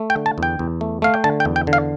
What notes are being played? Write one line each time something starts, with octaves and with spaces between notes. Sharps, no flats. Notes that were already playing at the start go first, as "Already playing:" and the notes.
Already playing: A3
G5
D3
A5
E2 G5
E2
A3
A3 F5
G5
D3 A5
G5
E2
G5
D3
F5